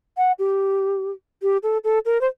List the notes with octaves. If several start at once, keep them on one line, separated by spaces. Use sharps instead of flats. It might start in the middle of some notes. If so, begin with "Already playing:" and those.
F#5
G4
G4
A4
A4
A#4
C5